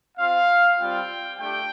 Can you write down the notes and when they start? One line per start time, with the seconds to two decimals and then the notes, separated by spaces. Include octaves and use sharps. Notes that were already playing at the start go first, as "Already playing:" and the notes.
0.18 C4 F4 F5
0.79 G3 C4 F4 G5
1.39 A3 D4 G4 G5